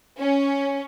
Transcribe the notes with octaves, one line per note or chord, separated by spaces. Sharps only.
C#4